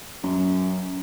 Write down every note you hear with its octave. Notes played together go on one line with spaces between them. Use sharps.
F#2